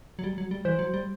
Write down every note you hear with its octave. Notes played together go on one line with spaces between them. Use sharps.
F#3
G3
F#3
G3
E3 C5
F#3
G3